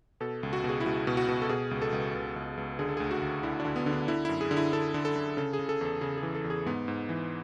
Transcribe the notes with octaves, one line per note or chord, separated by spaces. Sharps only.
B2 A4
C#2
F#4
B2
G#4
E4
C#2 F#4
B2
F#4
B2
A4
B2 G#4
C#2
A4
C#2
C#2
C#2
C#2
D3 G#4
A4
D2 G#4
F#4
D2
D3 E4
D4
D3
B3
D3
D4
D3 E4
F#2 E4
G#4
D3
E4
D3 A4
D3
A4
D3
C#3 A4
G#4
C#3
A4
E2 A4
C#3 G#4
G#4
E3
A4
E2
G#4
G#2 B3
G#2
E3